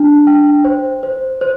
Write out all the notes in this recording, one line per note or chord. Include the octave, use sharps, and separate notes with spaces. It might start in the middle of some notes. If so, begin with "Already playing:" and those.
Already playing: D4
G5
C5
C5
C5